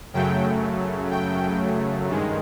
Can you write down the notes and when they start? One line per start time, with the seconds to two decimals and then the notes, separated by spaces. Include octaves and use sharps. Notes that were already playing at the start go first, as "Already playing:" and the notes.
0.13 F#2 C#3 F#3 A3 G5
1.11 G5
2.08 G2 D#3 G#3